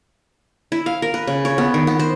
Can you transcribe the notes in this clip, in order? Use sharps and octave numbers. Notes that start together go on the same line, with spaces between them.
E4
F5
A#4
B4
C#3
C#5
B3
D#3
B3
C5